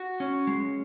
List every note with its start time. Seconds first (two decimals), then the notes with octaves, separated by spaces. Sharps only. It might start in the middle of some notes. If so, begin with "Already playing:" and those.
Already playing: F#4
0.20 C#4
0.47 G#3